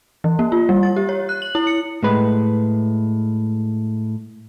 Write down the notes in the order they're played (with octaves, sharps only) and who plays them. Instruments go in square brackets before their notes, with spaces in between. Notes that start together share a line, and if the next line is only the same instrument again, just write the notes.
[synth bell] E3
A#3
F4
G3
A6
G4
C#5
F#6
F#7
E4
C#7
[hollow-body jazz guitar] A2 G#3 B4